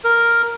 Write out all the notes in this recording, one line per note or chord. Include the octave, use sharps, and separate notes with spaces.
A#4